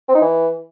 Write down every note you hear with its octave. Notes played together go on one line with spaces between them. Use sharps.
C4
D#4
E3